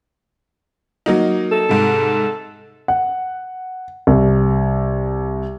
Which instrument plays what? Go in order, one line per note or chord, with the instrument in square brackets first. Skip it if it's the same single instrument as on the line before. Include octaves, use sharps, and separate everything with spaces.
[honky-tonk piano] F#3 A#3 D#4
[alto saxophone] A4
[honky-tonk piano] G#2 C3
[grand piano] F#5
C2